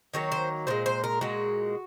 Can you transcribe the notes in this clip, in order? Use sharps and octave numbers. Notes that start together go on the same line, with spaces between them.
D#3 F#3 A#3 C#5
C5
A#2 G#3 C5
C5
A#4
A#2 G#3 F#4